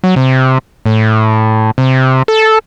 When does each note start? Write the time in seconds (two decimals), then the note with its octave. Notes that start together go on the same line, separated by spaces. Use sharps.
0.04 F#3
0.16 C3
0.86 A2
1.78 C3
2.28 A4